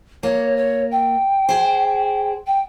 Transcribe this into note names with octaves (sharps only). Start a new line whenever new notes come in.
A#3 C#5
C#5
G5
G#4 C5
G5